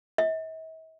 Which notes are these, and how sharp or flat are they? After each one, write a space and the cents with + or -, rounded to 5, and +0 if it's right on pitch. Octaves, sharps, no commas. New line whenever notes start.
E5 -45